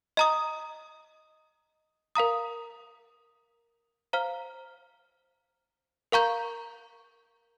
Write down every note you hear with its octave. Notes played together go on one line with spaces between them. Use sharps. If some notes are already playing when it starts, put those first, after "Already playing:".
D#5 A#5 D#6
A#4 F5 A#5 D#6
C5 F5 A#5 F6
A#4 F5 A#5 C#6 G6